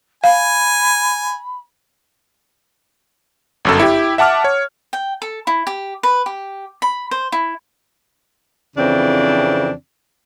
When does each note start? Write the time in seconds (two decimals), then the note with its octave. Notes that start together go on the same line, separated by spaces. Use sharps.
0.24 F5 G#5 B5
3.65 G1 F#2 A4
3.80 E4 G4
4.18 E5 F#5 A5 D6 F6
4.44 C#5
4.93 G5
5.22 A4
5.47 E4
5.67 G4
6.03 B4
6.26 G4
6.82 B5
7.11 C5
7.32 E4
8.77 F2 C#3 E3 C4 D4